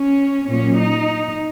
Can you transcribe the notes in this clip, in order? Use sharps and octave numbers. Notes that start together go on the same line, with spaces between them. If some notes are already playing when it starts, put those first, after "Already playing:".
Already playing: C#4
A#2 F#3 C#4
D#4